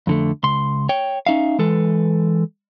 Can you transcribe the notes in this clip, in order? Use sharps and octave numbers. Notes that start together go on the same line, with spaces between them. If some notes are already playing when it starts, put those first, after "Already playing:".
F2 D3 A3
C#2 C6
C#5 G5
C#4 D#4 E5 F5
E3 G#3 A4 B4